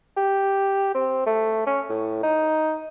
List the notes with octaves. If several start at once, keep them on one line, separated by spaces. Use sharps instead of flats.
G4
C4
A3
C#4
A2
D#4